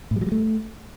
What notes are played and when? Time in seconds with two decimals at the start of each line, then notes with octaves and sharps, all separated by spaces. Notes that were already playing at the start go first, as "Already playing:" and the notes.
0.11 A2
0.16 G3
0.21 F#3
0.27 G3
0.32 A3